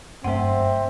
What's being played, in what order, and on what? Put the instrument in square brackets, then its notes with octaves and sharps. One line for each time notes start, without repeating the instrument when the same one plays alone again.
[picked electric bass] F#1 G2 A3 [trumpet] C4 [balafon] C5 F#5 [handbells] E5 C6